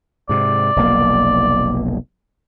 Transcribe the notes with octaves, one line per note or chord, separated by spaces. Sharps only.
G#2 C3 D5
F1 B1 A#3